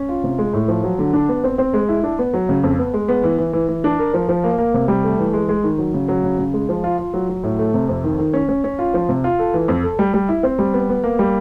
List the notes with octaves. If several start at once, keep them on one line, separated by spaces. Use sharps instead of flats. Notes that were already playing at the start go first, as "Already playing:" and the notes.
Already playing: C#4
F4
C3
G#3
A2
F3
F#3
D3
D4
B3
C4
C4
G#3
E4
D4
B3
F#3
C#3
F2
B3
G#3
B3
E3
E3
E3
E3
D4
A#4
F3
F3
A#3
A#3
C3
G3
A3
E3
G#3
G#3
D#3
F#3
C#3
F#3
C#3
C#3
G#3
F3
F4
F4
F#3
F#3
A2
A3
C3
F2
D#3
D#3
C#4
C#4
C#4
F4
F3
C3
F4
A4
E3
F2
A4
G3
G3
E4
C4
G3
B3
B3
A#3
G3